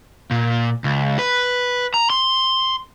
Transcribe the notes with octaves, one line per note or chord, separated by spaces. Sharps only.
A#2
C#2
B4
A#5
C6